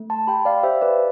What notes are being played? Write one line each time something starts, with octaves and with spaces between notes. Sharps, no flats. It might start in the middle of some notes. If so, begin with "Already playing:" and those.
Already playing: A3
A5 C6
G4 G5 B5
D5 F5
G4 C5 E5
B4 D5